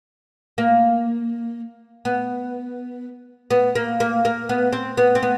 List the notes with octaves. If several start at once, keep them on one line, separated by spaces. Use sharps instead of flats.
A#3
B3
B3
A#3
A#3
A#3
B3
C4
B3
C4
B3